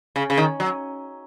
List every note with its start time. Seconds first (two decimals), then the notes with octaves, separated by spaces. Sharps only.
0.16 C#3
0.30 C#3
0.38 D#3
0.60 F#3